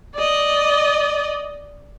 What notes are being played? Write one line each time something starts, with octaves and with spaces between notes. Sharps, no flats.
D5 D#5